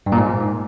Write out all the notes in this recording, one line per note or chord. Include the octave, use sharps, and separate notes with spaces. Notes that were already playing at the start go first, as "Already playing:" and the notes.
G2
A#2
G#2